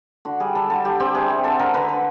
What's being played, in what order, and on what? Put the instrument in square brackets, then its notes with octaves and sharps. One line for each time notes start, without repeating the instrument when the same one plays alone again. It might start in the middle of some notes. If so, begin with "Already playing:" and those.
[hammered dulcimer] D3 F#4
G3 G#4
G3 A4
D3 A4
G3 G4
C4 G4
C3 G#4
C4
D3 A4
D3 A#4
D3 B4
D3